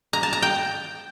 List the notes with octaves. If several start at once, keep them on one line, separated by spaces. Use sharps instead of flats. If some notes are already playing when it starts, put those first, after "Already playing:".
A#5
A5
A#5
G5